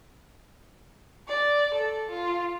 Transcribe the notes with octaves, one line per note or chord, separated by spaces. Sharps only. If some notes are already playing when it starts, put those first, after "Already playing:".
D5
A4
F4